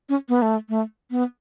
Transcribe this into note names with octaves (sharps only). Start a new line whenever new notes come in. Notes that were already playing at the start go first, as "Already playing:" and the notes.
C#4
B3
A3
A3
B3